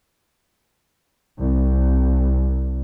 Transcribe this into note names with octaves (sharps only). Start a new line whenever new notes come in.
C2